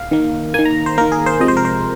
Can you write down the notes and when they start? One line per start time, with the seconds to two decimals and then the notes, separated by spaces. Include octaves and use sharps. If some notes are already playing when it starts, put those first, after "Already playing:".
Already playing: F5
0.11 D#3 A#3
0.54 D#3 A#3 G#5
0.65 A#5
0.86 C5
0.98 D#3 A#3 A#4
1.12 G#4
1.26 C5
1.40 C3 F3 G#3 D#5
1.48 C5
1.57 A#4
1.65 C5